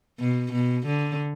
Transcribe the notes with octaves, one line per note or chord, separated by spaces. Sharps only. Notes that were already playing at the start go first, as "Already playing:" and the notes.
B2
B2
D3